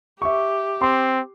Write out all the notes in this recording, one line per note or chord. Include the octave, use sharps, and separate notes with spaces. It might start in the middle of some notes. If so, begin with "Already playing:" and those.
G4 E5 C#6
C4 C6